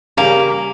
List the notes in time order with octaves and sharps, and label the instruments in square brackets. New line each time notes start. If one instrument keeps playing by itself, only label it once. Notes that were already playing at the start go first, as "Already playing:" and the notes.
[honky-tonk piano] C#3 G3 C#4 G4 [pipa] A#3